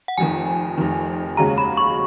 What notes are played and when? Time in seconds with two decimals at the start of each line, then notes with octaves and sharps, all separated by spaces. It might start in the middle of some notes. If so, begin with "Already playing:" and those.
0.08 F#5
0.18 F1 F2 D#3 G#5
0.78 F1 F2 D#3
1.37 D#2 C#3 G#3 C#4 F#4 A#5
1.58 B5
1.77 C#6